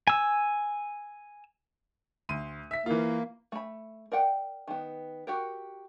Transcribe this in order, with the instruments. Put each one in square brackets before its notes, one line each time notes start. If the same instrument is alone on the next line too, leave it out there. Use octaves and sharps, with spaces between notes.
[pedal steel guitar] G#5 E6
[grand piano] D2 C6 D#7
E5 B6
[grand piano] E3 F4 [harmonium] A#3
[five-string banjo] A3 B5
A#4 D5 F#5 G5
D#3 B3
F#4 G4 A#4